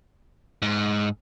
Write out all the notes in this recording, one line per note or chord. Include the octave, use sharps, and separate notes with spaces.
G#2